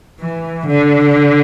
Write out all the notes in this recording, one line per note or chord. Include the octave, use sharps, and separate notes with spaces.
E3
D3